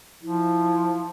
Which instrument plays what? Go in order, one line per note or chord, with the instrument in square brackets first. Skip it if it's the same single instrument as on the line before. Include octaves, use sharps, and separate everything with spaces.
[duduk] F3 [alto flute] E4